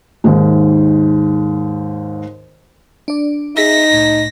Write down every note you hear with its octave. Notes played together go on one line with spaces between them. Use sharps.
D#2 G#2
D4 D5
D#4 G#4 E5 A#6 B6
C2 A2